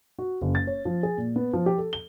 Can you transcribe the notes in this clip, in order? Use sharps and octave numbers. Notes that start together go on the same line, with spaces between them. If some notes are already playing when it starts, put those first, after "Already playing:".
F#4
F#1
A6
C#5
F3
G#4
A#2
B3
F3
G4
A4
G7